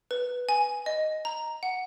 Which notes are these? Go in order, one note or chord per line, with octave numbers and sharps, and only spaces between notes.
B4
G#5
D#5
A#5
F#5